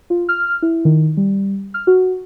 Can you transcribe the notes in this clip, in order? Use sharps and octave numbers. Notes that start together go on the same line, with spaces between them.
F4
F6
E4
D#3
G3
F6
F#4